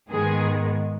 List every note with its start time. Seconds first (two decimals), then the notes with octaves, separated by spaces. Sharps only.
0.10 G#2 D#3 G#3 B3 G#4